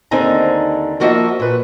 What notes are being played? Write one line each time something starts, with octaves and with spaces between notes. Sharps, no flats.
D#2 D3 C4 D#4 G#5 A#5
F3 A#3 F#4 D#5 E5
A#2 B4